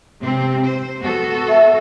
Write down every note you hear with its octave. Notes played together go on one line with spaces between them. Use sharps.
C3 C4
C5
B3 F#4 A4
E5